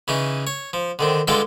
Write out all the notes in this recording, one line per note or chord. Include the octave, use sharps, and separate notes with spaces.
C#3 E3 C#4 D#4
C#5
F3
D3 D#3 C4
G2 D3 G#3 F4 A4 G5